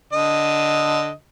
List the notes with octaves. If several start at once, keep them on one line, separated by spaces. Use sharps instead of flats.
D3 D#5